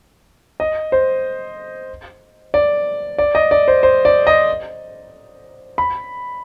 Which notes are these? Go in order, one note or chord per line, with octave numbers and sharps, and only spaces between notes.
D#5
C5
D5
D5
D#5
D5
C5
C5
D5
D#5
B5